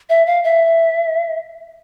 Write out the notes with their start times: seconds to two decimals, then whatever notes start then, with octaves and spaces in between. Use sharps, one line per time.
0.09 E5
0.26 F5
0.44 E5